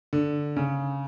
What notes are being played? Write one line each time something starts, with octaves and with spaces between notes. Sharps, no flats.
D3
C#3